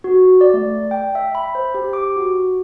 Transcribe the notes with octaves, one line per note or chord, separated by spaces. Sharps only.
F#4
D5
A3
G5
E5
B5
C5
G4
D6
F#4